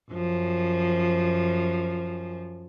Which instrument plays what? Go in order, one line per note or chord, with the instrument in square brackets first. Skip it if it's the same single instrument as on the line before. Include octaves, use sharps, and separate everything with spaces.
[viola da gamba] F#2 F3